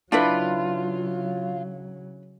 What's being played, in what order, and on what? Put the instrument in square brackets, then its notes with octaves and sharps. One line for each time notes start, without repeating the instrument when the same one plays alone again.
[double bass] C#3 F#3 [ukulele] D4 E4 B4 [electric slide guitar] F4